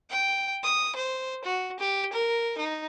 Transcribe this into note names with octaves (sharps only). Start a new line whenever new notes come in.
G5
D#6
C5
F#4
G4
A#4
D#4